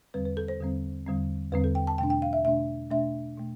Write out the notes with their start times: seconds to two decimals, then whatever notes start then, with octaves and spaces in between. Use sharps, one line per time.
0.14 E2 D3 G3 C4 B4
0.25 B4
0.37 A4
0.48 C5
0.60 E2 D3 G3 C4
1.06 E2 D3 G3 C4
1.52 E2 D3 G3 C4 B4
1.64 A4
1.75 G5
1.87 A5
1.98 B2 A3 D4 G5
2.10 G5
2.22 F5
2.33 E5
2.45 B2 A3 D4 E5
2.90 B2 A3 D4 E5
3.37 B2 A3